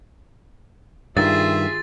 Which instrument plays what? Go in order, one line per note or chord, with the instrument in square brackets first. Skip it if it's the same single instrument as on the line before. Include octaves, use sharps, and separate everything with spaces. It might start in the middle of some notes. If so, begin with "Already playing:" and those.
[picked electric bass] G2 D#3 [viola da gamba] F4 G#4 [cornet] E5 [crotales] A6